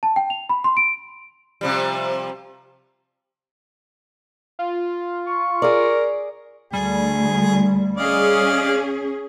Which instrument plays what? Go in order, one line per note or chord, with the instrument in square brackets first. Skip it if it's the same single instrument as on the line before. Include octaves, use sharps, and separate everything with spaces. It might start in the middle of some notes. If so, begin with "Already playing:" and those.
[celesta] A5
G5
F7
B5
C6
D7
[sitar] C3 F3 G3
[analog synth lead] F4
[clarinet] C#6
[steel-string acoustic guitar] G#4 D5 [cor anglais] A#4
[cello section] D2 [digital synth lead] G3 [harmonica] G#4
[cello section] C#4 G#4 [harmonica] D5 D#5 F5